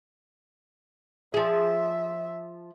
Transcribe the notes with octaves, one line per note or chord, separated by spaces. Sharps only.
F3 G#4 E5